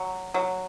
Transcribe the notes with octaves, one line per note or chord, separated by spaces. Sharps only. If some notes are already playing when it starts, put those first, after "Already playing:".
Already playing: F#3
F#3